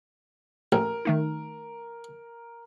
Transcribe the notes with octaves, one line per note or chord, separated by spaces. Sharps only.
A1 A#4
D#3 A3 D#4